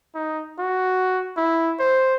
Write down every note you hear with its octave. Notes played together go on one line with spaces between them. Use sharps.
D#4
F#4
E4
C5